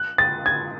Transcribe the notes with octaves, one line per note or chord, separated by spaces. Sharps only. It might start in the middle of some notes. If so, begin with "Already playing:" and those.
Already playing: F#6
A6
G#6